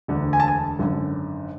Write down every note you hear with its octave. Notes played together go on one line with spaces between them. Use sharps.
E1 D2 D3
G#5
A5
G#5
G#1 F#2 D3